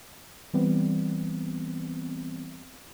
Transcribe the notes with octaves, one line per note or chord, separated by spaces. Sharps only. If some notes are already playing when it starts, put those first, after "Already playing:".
E3 G3 B3 C4